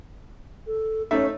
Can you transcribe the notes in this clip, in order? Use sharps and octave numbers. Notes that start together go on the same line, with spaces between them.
A4
A3 C#4 D#4 E5